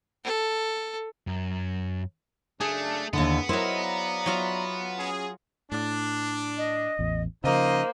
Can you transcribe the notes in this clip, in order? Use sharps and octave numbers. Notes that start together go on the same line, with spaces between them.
A4
F#2
F#2 C#3 A3 D4 G#4
D#2 D3 B3 E4
F#3 E4 A#4 C5 D#5
D5 F5 A#5
F#3 F4 E5
C#4 F#4 G#4
A2 D4
D#5
A1 E2
C#3 F3 A#3 D#4 C5 D#5